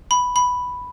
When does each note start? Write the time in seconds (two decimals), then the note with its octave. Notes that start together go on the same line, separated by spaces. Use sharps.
0.11 B5
0.36 B5